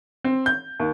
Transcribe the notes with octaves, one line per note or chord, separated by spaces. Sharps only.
C4
G6
D#2